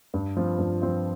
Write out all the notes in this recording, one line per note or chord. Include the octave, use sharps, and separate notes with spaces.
G2
F3 C4 F4
G2
F3 C4 F4